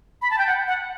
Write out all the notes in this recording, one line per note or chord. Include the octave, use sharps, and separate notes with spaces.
B5
A5
G5
F#5
F#5